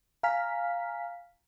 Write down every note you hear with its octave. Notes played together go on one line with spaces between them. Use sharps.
F5 G#5 A#5 F6 B6